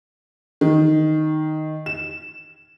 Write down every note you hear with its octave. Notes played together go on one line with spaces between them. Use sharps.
D#3
E7